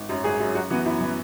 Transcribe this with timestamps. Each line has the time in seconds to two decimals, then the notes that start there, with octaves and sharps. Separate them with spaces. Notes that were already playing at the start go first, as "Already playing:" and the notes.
Already playing: G#1
0.09 F#2 F#3
0.24 G#1 G#4
0.40 F#2 F#3
0.55 F#2 F#4
0.71 E3 B3 F#4
0.85 F#2 E4
1.01 E3 B3